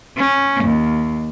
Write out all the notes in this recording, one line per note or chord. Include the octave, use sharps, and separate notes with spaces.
C#4
D#2